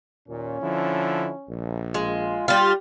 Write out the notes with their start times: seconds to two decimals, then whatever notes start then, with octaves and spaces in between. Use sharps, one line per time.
0.28 D#2 A#2 C#4
0.62 D3 F3 E4
1.49 A#1
1.94 G#3 F4
2.48 G3 F4 G4